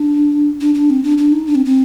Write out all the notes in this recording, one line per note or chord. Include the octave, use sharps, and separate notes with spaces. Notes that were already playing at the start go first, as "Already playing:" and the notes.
Already playing: D4
D4
D4
C4
D4
D4
D#4
D4
C4
C4